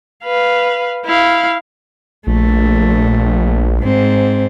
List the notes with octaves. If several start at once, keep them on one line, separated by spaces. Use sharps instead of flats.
B4 F5
E4 F5
A#1 A3
G#2 C4